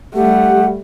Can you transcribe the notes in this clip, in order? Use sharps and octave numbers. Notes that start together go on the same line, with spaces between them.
G3 A3 G4 F#5